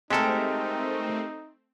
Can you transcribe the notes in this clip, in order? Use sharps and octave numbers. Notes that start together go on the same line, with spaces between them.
G#3 A3 C4 D#4 G4 A4 A#4